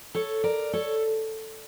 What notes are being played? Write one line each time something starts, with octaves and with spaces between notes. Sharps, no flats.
A4 C#5
A#4 D5
A4 C#5